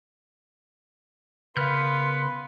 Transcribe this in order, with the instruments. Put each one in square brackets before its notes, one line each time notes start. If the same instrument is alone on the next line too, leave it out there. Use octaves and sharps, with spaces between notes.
[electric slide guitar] C#3 A#4 F5 [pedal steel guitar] B3 F6 G6 [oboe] B4 [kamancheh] C6